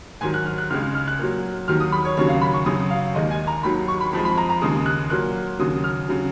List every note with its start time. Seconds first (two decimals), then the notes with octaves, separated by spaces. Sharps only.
0.21 G#2 D#3 F#3 G#5
0.34 F#6
0.46 F6
0.58 F#6
0.70 C#2 C#3 G#3 F6
0.82 F6
0.95 F6
1.07 F#6
1.19 A#2 F#3
1.68 D#2 D#3 F#3 F6
1.80 D#6
1.92 B5
2.05 C#5
2.17 D#2 C#3 F#3 C#5
2.29 F5
2.41 B5
2.54 C#6
2.66 F#2 C#3 F#3 D#6
2.90 F5
3.15 D#2 D#3 G#3 D#5
3.31 G#5
3.47 A#5
3.63 D#2 D#3 F#3 B5
3.88 C#6
4.01 B5
4.13 F2 F3 G#3 B5
4.25 B5
4.38 A#5
4.50 A#5
4.61 D#2 C#3 G#3 D#6
4.86 F#6
5.10 A#2 F#3 F#6
5.59 D#2 C#3 F#3 D#6
5.84 F6
6.09 C#3 F#3